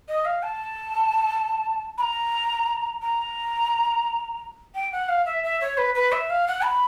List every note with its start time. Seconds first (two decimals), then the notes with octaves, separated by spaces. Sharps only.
0.08 D#5
0.25 F5
0.43 A5
1.98 B5
2.01 A#5
3.02 A#5
4.75 G5
4.92 F#5
5.09 F5
5.26 E5
5.44 E5
5.61 C#5
5.78 B4
5.95 B4
6.12 E5
6.30 F5
6.48 F#5
6.64 B5